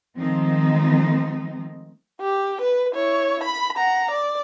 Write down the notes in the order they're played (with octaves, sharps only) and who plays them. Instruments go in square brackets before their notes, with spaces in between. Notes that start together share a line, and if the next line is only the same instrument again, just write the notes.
[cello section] D#3 F3 G#3 A3 C4 D#4
[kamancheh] G4
B4
E4 C#5
B5
F#5 A#5
D5